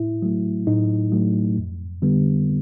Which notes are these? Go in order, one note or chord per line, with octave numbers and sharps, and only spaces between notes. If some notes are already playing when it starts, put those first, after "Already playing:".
Already playing: A2 E4
F#3 A3
A2 D#4
F#3 A3
F2
D3 G3 B3